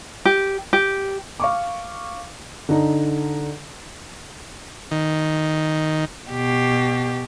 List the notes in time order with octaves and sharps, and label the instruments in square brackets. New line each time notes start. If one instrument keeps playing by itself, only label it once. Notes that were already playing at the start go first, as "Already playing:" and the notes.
[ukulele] G4
G4
[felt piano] F5 C#6 D6
D3 D#4
[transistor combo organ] D#3
[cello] B2 G4